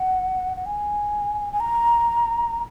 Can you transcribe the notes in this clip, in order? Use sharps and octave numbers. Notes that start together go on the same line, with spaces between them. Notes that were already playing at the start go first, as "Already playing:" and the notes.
Already playing: F#5
F#5
G#5
G#5
A#5